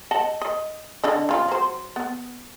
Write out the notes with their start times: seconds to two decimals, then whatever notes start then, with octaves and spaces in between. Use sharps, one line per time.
0.11 D#5 F#5 A5
0.42 D#5
1.04 D3 D4 D#5
1.29 C#3 F4
1.48 F#3 C5
1.96 B3